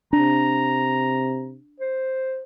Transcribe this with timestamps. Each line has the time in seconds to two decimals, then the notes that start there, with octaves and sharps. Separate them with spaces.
0.13 C3 D4 A#5
1.80 C5